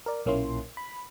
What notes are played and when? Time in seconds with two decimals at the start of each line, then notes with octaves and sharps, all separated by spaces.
0.06 A#4 D5
0.26 B1 A#2 A#3 C#4 E4 C6
0.77 B5